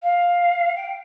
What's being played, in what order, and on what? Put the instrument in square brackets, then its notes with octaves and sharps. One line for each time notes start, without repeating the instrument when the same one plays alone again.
[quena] F5
G5